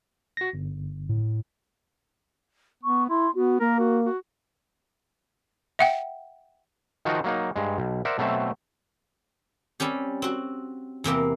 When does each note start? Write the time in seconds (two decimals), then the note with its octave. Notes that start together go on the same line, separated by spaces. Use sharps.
0.37 F#4 A#6
0.53 G1
1.09 A2
2.83 B3 C#6
3.09 E4 C6
3.35 B3 F#4
3.60 A#3 A#4
3.79 F#4
4.05 F#4
5.79 E5 F#5 G5
7.05 D#3 F3 D#4 F4 F#4
7.24 F#3 A#3 D#4
7.56 G2 G#3
7.78 B1
8.05 A#4 C5 D5 E5 F#5
8.18 B2 F#3 A3 C4 E5
9.80 G3 C4 C#4 G4
10.22 C4 F#4
11.04 E2 C3 A#3 C4